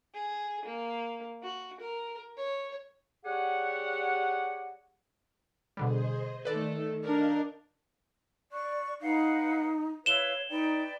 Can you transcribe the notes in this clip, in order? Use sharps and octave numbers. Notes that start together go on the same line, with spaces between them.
G#4
A#3
F#4
A#4
C#5
G3 G4 G#4 C#5 F#5
B2 D3 G3 G#4 C5 D#5
D#3 A3 A4 B4 D5
D4 A#4 D#5 F5 G6
D5 C#6 F#6
D#4 B4 F5 F#5
E4 B4 C#5 F5 E7 G7
D#4 B4 D5 G5